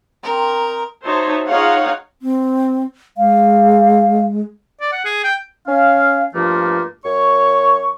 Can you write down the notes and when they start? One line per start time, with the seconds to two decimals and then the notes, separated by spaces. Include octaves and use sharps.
0.23 C4 D#4 A#4
1.04 D#4 F#4 C5 C#5 E5 A5
1.47 D#4 F4 G#4 C#5 F5 F#5
2.22 C4
3.17 G#3 F5
4.81 D5
4.92 F#5
5.05 G#4
5.24 G5
5.67 C#4 F5
6.34 G2 F3 A3 A#3 F4
7.05 F#2 C#5 C#6